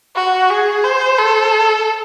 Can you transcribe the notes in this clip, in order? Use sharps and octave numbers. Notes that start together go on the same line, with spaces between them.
F#4
G#4
C5
A4